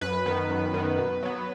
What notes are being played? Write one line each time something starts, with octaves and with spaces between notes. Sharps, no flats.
F#2 B4
D#3 B3
F#2
D#3 B3
B2
F#3 B3